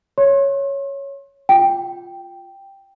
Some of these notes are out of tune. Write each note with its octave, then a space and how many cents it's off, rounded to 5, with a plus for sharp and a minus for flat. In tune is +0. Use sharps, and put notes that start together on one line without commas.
C#5 +0 C6 +40
F4 +0 G5 +0